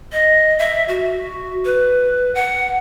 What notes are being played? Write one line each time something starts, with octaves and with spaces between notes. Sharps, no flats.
D#5
E5
F#4
B4
F#5